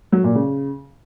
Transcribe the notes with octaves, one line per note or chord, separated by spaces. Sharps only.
F#3
A#2
C#3